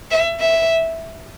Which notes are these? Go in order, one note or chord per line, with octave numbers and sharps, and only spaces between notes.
E5
E5